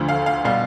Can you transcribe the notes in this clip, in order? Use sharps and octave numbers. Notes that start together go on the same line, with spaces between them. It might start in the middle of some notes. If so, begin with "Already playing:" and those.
Already playing: D2 D3 F3 A3
F5
F5
B2 G3 F5